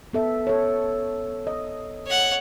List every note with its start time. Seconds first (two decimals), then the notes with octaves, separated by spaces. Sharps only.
0.13 B3 A4 E5
0.47 A4 C#5
1.47 D#5
2.07 C#5 F#5